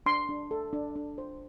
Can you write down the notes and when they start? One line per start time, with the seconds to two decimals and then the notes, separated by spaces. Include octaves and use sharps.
0.06 D4 C6
0.29 D4
0.51 A4
0.73 D4
0.96 D4
1.18 C5